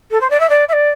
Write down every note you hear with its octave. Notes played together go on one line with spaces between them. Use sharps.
A4
C5
D5
E5
D5
E5
D5